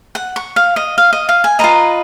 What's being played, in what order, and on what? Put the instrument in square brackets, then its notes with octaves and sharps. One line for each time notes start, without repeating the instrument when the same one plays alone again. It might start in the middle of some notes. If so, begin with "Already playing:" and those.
[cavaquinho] F#5
C#6
F5
D#5
F5
D#5
F5
G#5
F4 B4 D#5 A#5